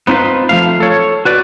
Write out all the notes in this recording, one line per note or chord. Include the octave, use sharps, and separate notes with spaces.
B3 C4 D#4 F4 B4
F3 A3 F5
A4 C#5
F#4 B4 D5